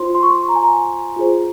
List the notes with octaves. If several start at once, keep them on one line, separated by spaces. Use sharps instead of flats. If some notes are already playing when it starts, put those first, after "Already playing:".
Already playing: F4 C5 C6
C6
C#6
C6
A#5
G#5
A#5
F4 G#4 C5